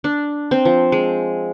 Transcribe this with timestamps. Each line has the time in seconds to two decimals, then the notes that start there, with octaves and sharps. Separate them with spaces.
0.04 D4
0.51 C4
0.65 F3
0.92 G#3